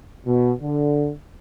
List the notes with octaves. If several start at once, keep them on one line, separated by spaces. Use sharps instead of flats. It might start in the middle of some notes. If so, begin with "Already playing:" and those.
B2
D3